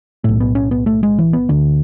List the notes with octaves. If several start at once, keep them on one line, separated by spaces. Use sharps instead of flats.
B1 A2 A3
B3
C#4
B3
A3
G#3
E3
B3
D2 D3